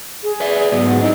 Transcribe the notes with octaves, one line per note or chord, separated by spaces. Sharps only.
G#4
B4 D5 E5
G#2 F#3 B3
F#5
C4 D#4 E4